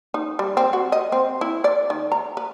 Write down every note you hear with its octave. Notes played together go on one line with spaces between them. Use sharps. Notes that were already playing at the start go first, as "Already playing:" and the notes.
D#4
G3
C4
F#4
D#5
C4
E4
D5
D#3
A#5
B4